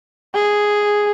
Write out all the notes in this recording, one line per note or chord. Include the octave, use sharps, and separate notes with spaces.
G#4